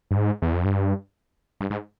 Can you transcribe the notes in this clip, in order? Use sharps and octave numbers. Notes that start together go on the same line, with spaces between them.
G2
G#2
E2
F2
G2
G2
G#2